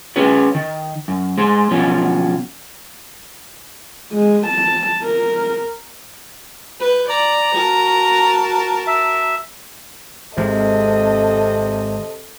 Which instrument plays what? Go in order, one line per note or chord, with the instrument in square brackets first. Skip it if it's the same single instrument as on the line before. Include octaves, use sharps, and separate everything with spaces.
[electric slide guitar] C#4 G#4 B4 C#5
D#3
F#2
G#3 C5
B2 F3 F#3 C#4
[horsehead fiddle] G#3
A5
A#4
[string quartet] B4 G6
[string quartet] D5 [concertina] A#5
[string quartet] F#4 A#4 A5
[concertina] E5
[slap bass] G#1 G#3 [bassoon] C3 [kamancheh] A4 D#5